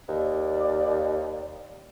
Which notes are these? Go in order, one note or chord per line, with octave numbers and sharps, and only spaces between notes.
D#2 D5